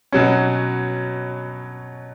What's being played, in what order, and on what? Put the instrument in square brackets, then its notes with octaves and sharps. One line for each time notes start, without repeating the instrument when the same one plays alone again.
[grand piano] B2 F#3 C#4